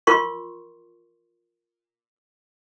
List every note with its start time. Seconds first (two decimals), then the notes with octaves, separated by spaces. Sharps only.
0.07 F4 A#4 C6 C#6